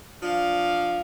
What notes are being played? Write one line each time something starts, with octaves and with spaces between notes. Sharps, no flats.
F3 D4 F5